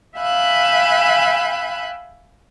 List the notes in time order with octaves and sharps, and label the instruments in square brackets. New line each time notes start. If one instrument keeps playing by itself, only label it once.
[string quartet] E5 F5 G5 G#5 B5 F#6